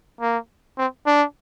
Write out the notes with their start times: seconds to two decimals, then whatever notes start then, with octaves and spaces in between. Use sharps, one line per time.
0.21 A#3
0.78 C4
1.07 D4